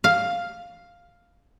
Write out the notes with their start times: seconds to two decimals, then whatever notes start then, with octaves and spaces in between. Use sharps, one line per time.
0.04 F5